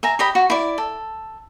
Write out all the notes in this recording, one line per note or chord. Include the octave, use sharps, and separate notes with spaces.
E5 G#5 A#5
G4 D#5 B5
F#4
E4 D5
A4